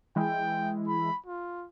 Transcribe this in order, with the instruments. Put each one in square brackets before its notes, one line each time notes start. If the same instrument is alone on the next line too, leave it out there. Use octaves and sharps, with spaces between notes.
[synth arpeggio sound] E3 G#3 E4 [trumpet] G5
[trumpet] B5
F4